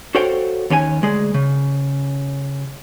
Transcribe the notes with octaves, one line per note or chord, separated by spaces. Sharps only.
F#4 A4 C5 C#5 F5 G5
D#2 C#4 A4 G#5
D2 G#3 G#4
C#3